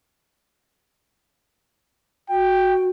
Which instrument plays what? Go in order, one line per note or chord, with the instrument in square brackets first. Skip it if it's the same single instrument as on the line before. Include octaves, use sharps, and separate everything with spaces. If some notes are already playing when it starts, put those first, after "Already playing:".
[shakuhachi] F#4 [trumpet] G5